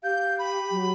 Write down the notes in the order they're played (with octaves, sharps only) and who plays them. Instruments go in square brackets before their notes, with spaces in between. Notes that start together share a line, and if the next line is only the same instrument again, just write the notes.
[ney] G4 [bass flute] F5 [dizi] G6
[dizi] B5
[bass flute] F#3